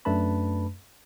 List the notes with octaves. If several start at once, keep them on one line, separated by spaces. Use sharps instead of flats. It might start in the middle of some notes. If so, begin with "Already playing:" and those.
F#2 A3 D4 B4 A5 B5